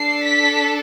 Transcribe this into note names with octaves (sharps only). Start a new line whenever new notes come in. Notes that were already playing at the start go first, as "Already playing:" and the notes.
Already playing: D4 A4 C7
B6